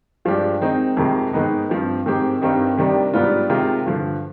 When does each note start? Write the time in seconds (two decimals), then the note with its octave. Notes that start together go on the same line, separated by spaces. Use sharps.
0.25 G2 F3 G#3 D4 G4
0.61 D#3 G#3 C4 D#4
0.97 F2 C3 D#3 G#3
1.33 G#2 D#3 G#3 B3 D#4
1.69 G2 F3 C4
2.06 G#2 D#3 G#3 C4 G4
2.41 G2 D#3 G3 C4 D#4
2.77 C3 D#3 G3 D4
3.14 G#2 G3 B3 D4 F4
3.50 C3 D#3 G#3 C4 F4
3.86 G2 D3 F3